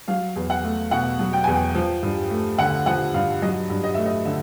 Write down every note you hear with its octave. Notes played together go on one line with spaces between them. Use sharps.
F#3 F5
E2
F#5
A3
B2 F#5
F#3
G5
E2 G#5
G5
F3
G2
A3
D3 F#5
F3 F#5
G2 F5
F#3 D#5
G2
D#5
A3 E5
D#5
D3 E5